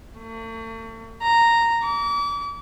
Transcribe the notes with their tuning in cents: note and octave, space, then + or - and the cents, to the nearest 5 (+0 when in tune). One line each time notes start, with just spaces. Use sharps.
A3 +45
A#5 -10
D6 -40